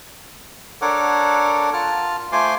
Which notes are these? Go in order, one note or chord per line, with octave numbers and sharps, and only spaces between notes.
D4 A4 A#4 C#5 F#5 D6
F4 A5 F6
A3 F4 C5 G#5 C6 D6